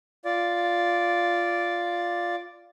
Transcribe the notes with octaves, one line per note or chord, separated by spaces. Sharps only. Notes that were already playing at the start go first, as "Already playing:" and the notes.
F4 D5